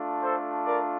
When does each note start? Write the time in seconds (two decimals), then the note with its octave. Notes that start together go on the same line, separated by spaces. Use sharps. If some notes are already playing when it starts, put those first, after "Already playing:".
Already playing: A3 D4 F4
0.22 A4 C5
0.65 A#4 D5